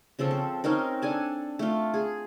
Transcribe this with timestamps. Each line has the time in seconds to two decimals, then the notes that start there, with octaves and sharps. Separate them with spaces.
0.19 C#3 F3 C4 A4
0.31 C4
0.64 C4 C#4 D#4 A#4
1.02 D4 A4 G#5 A5
1.59 A3 F4
1.94 G#4